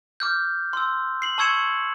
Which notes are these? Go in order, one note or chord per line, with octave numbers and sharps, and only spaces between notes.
D6 F6 G6
C6 E6
C7 F#7
A5 C#6 E6 G#6 C#7 E7